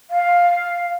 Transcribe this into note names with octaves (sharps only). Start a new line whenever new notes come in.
F5